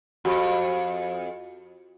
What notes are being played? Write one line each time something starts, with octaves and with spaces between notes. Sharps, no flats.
F2 F#4 G4